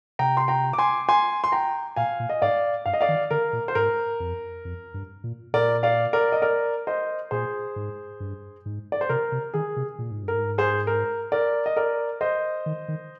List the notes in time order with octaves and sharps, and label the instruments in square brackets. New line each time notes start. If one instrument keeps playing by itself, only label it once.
[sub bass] C3 [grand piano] G5 A#5
[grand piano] C6
G5 A#5
D6
G#5 C6
G#5 C6
C6
G5 A#5
[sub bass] A#2 [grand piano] F5 G#5
[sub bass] A#2
[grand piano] D#5
[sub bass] G#2 [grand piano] D5 F5
[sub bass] G2 [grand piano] F5
[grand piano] D#5
D5 F5
[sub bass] D#3
[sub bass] D3 [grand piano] A#4
[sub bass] A#2
[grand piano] C5
[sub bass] G#2 [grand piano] A#4
[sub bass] F2
F2
G2
A#2
[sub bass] A#2 [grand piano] A#4 D5
[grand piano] D5 F5
A#4 D5
D#5
A#4 D5
C5 D#5
[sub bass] A#2 [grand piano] G#4 C5
[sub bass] G#2
G2
G#2
[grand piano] D5
C5
[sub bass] C3 [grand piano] A#4
[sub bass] C3
[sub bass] D#3 [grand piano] G#4
[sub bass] C3
A#2
G#2
G2
[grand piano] A#4
[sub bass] G#2
[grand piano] G#4 C5
A#4
A#4 D5
D#5
A#4 D5
C5 D#5
[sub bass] D#3
D#3